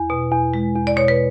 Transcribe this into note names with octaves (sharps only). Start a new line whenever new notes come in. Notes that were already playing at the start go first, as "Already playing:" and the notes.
Already playing: E2
B2
E2
G#3
E2
D5
B2 C#5
B4